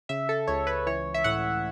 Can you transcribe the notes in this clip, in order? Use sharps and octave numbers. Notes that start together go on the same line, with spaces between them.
C#3 E5
A4
C#2 C#5
B4
E3 C#5
E5
A2 F#5